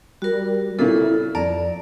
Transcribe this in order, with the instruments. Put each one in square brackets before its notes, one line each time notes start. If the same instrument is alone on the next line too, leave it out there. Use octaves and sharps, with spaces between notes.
[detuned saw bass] G3 [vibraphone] F#4 A#4
[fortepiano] A#2 C#3 [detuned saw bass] E4 [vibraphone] A4
[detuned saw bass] F2 [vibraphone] D5 [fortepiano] A5 A#5